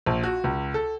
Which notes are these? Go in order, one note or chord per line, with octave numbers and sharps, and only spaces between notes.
A#1
F#4
C#2
A4